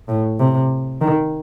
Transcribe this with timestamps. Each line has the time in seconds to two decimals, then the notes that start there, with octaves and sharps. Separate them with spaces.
0.08 A2
0.39 C3
1.01 D#3